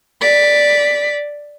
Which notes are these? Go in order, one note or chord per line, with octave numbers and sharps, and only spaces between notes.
D5 B6